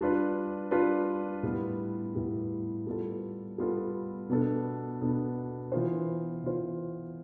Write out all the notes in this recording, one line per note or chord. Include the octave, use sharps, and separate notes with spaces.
G3 D4 F4 B4 D5
G3 D4 F4 B4 D5
A2 G3 B3
A2 G3 B3
G3 B3 F4 A4
G3 B3 F4 A4
B2 B3 D4 A4
B2 B3 D4 A4
E3 B3 F4 C5
E3 B3 F4 C5